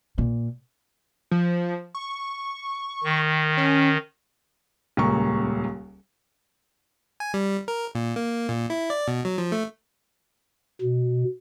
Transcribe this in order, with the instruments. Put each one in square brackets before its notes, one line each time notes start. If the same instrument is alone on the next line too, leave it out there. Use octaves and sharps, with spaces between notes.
[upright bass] A#2
[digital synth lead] F3
C#6
[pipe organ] D#3
[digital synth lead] C#4
[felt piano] D#1 C#2 A#3 C#6
[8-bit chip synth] G#5
G3
A#4
A#2
A#3
A#2
E4
D5
B2
F#3
F3
A3
[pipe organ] B2